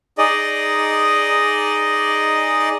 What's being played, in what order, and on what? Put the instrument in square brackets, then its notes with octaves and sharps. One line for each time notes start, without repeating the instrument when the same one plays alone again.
[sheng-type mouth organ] D#4 G#4 D5 D#5